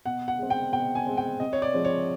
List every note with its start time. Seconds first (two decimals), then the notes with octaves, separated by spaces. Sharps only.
0.06 B2 F#5
0.28 F#5
0.39 G#3 C4
0.50 G5
0.72 B2 G5
0.95 G#5
1.06 G#3 C4
1.17 G5
1.40 C3 D#5
1.53 C#5
1.62 D5
1.73 F3 G#3 C4
1.85 C#5